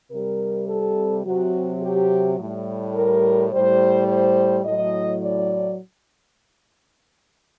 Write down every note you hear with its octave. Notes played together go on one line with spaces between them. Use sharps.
C3 G3 A#4
A4
C3 F#3 F#4
G4
A2 G3
A#4
A2 G3 C5
C5
A2 F#3 D#5
D5